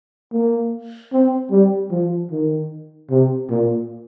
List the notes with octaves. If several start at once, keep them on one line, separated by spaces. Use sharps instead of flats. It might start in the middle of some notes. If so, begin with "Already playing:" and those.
A#3
C4
G3
F3
D#3
C3
A#2